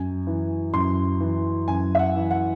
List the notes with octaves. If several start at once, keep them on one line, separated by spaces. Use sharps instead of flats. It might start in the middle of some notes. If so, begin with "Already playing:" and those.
Already playing: F#2 G#5
E3
F#2 C6
E3
F#2 G#5
E5
F#5
E3
F#5